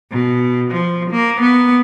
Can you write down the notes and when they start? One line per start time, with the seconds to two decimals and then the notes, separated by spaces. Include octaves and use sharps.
0.11 B2
0.71 F3
1.10 A#3
1.41 B3